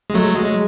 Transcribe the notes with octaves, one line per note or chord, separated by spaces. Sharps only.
G#3
F#3 A3
G#3
G#3